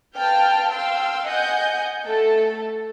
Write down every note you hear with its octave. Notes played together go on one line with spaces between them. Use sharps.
B4 F5 G5 A5 F6 G6
F5 G5 C6 E6
D#5 F#5 G#5 G6
A3 A4